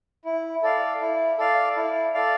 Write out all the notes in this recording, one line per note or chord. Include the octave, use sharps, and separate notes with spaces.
E4
A4 D5 F5
E4
A4 D5 F5
E4
A4 D5 F5